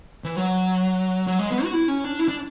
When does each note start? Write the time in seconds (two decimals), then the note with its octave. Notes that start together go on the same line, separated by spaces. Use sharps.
0.24 E3
0.35 F#3
1.27 F#3
1.39 G#3
1.50 B3
1.64 F#4
1.73 E4
1.88 C#4
2.04 D4
2.19 E4
2.28 D4